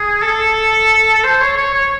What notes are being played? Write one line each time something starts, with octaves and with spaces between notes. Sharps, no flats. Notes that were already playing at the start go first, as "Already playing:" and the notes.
Already playing: G#4
A4
C5
C#5
C#5
C#5